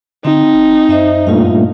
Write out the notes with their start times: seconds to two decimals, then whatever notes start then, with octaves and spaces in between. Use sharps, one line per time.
0.25 D3 C4 D#4 G5
0.55 E1
0.89 F#2 C5 D#5 E5
1.27 G2 A#2 A3 F4 F5